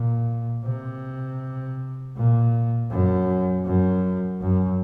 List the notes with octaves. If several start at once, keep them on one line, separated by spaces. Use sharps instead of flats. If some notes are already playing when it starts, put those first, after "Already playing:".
Already playing: A#2
C3
A#2
F#2
F#2
F#2